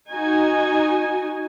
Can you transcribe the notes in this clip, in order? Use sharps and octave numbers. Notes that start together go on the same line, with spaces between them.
D#4 F#4 G#5